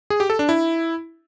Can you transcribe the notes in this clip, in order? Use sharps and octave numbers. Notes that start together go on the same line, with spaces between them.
G#4
G4
A4
D4
E4